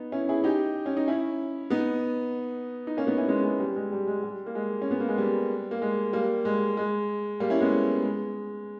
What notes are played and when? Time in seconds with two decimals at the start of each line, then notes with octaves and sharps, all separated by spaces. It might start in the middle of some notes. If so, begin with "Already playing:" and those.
Already playing: B3 D#4
0.12 C#4 E4
0.29 E4 G#4
0.44 D#4 G4
0.86 C#4
0.97 D#4
1.08 C#4 E4
1.70 B3 D#4
2.87 D#4
2.97 A#3 C#4
3.07 B3 D#4
3.18 C#4 E4
3.28 G#3 B3
3.44 G#3
3.60 G3
3.76 G#3
3.92 G3
4.07 G#3
4.24 G3
4.46 A#3
4.55 G#3
4.82 C#4
4.91 B3
5.00 A#3
5.09 G#3
5.18 G3
5.71 A#3
5.82 G#3
6.13 G3 A#3
6.45 G#3
6.77 G#3
7.40 G3 A#3
7.50 C#4 E4
7.61 G#3 B3
8.02 G#3